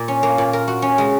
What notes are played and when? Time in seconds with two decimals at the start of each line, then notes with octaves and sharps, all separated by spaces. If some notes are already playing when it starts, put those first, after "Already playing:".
Already playing: A#2
0.08 C#4
0.23 A#3
0.38 A#2
0.53 A#4
0.68 F#4
0.82 C#4
0.98 G#3